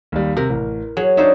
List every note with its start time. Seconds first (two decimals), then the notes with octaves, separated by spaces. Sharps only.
0.12 D#2 G3
0.37 C3 A#4
0.50 A1
0.97 F#3 G#4
1.17 D4 D#4 C5 C#5 E5